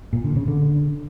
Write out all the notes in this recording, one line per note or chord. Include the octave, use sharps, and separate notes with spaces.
A#2
D3
C#3
D3